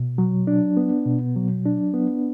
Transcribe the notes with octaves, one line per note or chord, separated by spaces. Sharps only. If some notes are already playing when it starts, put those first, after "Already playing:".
Already playing: B2
F#3
D4
B3
B2
F#3
D4
B3